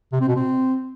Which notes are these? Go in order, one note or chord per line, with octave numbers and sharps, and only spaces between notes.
C3
C4
B2
C4